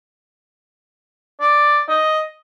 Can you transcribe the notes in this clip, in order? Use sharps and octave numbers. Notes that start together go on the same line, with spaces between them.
D5
D#5